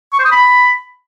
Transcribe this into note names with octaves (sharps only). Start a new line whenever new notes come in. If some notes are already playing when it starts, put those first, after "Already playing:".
C#6
C5
D#6
B5